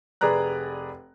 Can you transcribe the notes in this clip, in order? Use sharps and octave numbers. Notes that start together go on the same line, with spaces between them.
F1 G#4 B4 D5 A#5 F#6